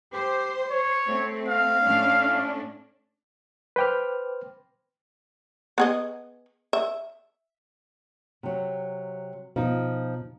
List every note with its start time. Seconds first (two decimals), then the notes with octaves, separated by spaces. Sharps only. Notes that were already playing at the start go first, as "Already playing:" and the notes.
0.13 G4 C5
0.70 C#5
1.07 A3 C4
1.48 F5
1.84 A2 C#4 D4
3.76 B4 C5 G5 D6 F6
5.78 B3 G#4 D#5
6.73 E5
8.43 C3 F#3
9.56 B2 F3 D#4